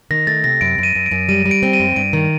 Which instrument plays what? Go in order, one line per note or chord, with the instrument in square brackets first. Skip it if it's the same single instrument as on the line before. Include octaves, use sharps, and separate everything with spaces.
[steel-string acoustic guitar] D#3 [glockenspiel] A#6
[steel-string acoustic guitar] A3 [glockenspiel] A6
[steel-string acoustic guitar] C3 [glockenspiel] A#6
[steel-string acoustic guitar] F#2 [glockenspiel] D7
[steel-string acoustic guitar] F#2
[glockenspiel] D#7
[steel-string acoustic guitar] F#2
[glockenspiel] D7
[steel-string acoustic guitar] F#2
[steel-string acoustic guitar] G3 [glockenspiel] D#7
[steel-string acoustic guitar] G3
[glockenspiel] D7
[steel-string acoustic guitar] C4
[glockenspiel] D#7
[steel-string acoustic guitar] F#2
[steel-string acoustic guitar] G2 [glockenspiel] D7
[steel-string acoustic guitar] D#3